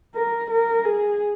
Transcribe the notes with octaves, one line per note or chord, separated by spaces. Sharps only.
A#4
A#4
G#4